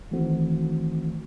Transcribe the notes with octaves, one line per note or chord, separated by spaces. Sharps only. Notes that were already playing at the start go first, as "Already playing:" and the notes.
D#3 E3 A3 C4 F#4